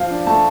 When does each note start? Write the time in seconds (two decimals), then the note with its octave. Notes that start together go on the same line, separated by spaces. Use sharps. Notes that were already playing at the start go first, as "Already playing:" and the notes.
Already playing: F3 F5
0.10 D4
0.27 A3 A5